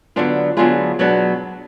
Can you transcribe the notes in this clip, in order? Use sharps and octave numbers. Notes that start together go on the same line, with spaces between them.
D3 F#3 B3 D4 F4
D3 F#3 B3 D4 F4 G#4 B4
B2 F#3 B3 D4